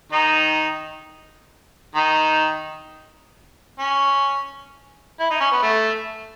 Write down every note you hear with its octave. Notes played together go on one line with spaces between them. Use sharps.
D#3 D#4
D#3 D#4
C#4
E4
D#4
C#4
B3
A3